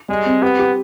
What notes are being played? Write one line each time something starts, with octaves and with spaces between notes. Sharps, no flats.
G3 G#3
C4
B3 G4
G4